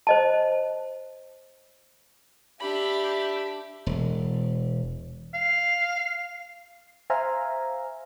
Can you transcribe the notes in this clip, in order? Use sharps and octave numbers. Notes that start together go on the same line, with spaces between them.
C5 D#5 A5
D4 G4 E5 B5
E1
F5
C5 E5 F5 G#5 A#5